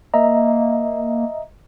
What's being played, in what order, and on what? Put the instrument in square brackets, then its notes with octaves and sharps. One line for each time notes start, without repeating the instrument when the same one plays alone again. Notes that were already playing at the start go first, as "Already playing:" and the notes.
[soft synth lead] A#3 [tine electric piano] D#5 E5 A#5